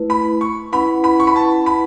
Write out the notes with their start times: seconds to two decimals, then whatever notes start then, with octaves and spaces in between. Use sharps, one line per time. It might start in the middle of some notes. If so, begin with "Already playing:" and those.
Already playing: A3 E4 B4
0.10 B5
0.41 C#6
0.72 C#4 E4 B4 F#5 B5
1.04 B5
1.20 C#6
1.27 B5
1.36 A5
1.66 B5